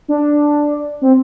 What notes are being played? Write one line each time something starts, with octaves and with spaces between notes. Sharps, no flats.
D4
C4